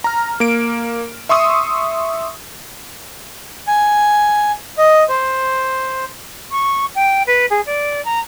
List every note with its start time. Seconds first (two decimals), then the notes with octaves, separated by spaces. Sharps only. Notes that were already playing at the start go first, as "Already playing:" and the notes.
0.04 A#5 F6
0.40 A#3 D7
1.29 E5 C6 C#6 D#6 E6
3.68 G#5
4.78 D#5
5.09 C5
6.51 C#6
6.95 G5
7.27 B4
7.50 G#4
7.66 D5
8.05 A#5